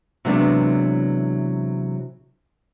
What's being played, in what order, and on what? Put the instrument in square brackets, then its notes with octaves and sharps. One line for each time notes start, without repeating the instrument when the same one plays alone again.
[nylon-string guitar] C3 E3 F#3 G#3 B3 D4